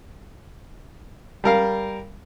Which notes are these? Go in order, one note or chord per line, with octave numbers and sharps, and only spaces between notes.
G3 A#4 F5